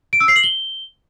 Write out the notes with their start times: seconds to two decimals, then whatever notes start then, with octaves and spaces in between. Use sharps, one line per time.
0.13 D7
0.20 E6
0.28 C7
0.36 F#7
0.44 G7